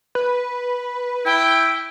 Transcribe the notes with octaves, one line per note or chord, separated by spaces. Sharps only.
B4
E4 G5